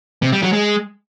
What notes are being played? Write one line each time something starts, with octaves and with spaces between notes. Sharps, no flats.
C3
G3
F#3
G#3